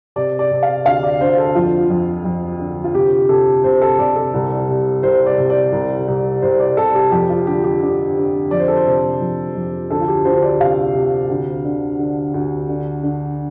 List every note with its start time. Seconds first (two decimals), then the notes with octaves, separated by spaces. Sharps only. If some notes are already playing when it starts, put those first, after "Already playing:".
0.16 C3 D5
0.39 D5
0.51 C3
0.62 F5
0.85 D2 F5
1.03 D5
1.20 D2 C5
1.38 A4
1.55 F2 F4
1.90 F2
2.24 F2
2.59 D3
2.84 F4
2.95 C3 G4
3.29 C3 A4
3.64 C3 C5
3.81 A4
3.99 C3 D5
4.16 A4
4.34 C2
4.68 C3
5.03 C2 C5
5.26 D5
5.38 C3
5.50 D5
5.72 C2
6.08 C2
6.42 C2 C5
6.60 D5
6.77 C3 A4
6.95 G4
7.12 F2 G4
7.29 F4
7.47 D3 G4
7.64 G4
7.82 D3
8.16 D3
8.51 F2 D5
8.59 C5
8.68 A4
8.76 C5
8.86 C3
9.21 F2
9.55 F2
9.90 D2 A4
10.01 F4
10.08 G4
10.25 D2 C5
10.42 D5
10.60 C3 F5
10.95 C3
11.29 D2
11.64 D3
11.99 D3
12.34 D2
12.69 D3
13.03 D3